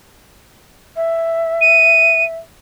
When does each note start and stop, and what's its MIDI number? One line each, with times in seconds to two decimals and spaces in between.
0.96 2.35 76
1.61 2.24 99